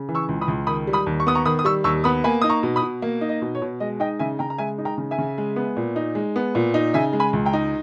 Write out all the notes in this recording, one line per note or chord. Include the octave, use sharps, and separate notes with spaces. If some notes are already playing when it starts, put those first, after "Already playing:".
Already playing: C#3
E3
C#6 E6
C#2
B5 D#6
C#2
D#3 B5 D#6
G3
B5 D#6
D#2
C#6
B3 D#6
A#5 C#6
D#3 B5 D#6
D#6
G3 C#6 E6
D#2 C#6 E6
B3 B5 D#6
A#3 G#5 B5
D#4 D#6
A#5 C#6
B2
B5 D#6
B2
A#3
D#4
D#5
B2
C#5
B2
G#3 D#5
D#4 D#5 G5
C#3 E5 G#5
C#3 G5 A#5
A#5
G#3 E5 G#5
D#4
G5 A#5
C#3
E5 G#5
C#3
G#3
B3
A#2
D#4
G#3
B3
A#2
D#4
C#3 E5 G#5
G#3
G#5 B5
C#2
G5 A#5
D#4